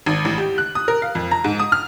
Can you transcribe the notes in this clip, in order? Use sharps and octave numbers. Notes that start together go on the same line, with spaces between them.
G#1
A1
G4
F#6
D#6
A#4
F5
F2
A#5
G#2
D#6
F6